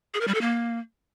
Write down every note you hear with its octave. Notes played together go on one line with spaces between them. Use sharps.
G#4
A#4
G3
A4
A#3